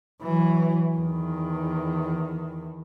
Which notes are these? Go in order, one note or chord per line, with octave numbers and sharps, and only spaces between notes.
E3 F#3
E2 D#3